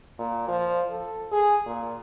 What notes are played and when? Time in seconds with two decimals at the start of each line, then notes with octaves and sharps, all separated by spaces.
0.19 A#2
0.48 F3
0.90 A4
1.32 G#4
1.66 A#2